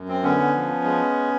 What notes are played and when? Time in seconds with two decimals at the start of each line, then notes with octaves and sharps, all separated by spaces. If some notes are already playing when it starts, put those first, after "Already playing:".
Already playing: F#2
0.08 C4
0.23 D3 B3 C#4
0.55 F3
0.84 G#3